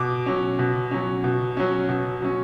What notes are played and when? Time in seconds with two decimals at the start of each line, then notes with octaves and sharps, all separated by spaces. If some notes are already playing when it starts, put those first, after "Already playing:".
Already playing: B2 D6
0.26 F#3 C#4
0.59 B2
0.91 F#3 C#4
1.24 B2
1.57 F#3 C#4
1.89 B2
2.22 F#3 C#4